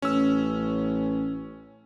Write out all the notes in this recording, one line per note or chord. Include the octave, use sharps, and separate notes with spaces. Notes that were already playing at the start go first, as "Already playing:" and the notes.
A1 C#4 E6